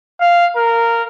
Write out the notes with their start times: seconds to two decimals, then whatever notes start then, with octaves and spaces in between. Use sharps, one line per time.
0.21 F5
0.56 A#4